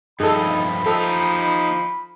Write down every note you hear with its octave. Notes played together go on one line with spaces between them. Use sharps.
G2 F3 D#4 G#4 A4 B5
F3 D#4 G4 A4